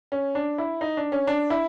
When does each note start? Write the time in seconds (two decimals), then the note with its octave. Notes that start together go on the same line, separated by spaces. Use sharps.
0.12 C#4
0.35 D4
0.58 E4
0.81 D#4
0.97 D4
1.12 C#4
1.27 D4
1.50 E4